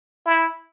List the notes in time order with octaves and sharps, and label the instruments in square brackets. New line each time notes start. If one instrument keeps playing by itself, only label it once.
[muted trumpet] E4